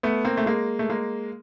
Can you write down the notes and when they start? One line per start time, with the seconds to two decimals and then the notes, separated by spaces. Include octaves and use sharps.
0.03 A3 B3
0.25 A#3 C4
0.37 A3
0.46 G#3 A#3
0.79 A3
0.89 G#3 A#3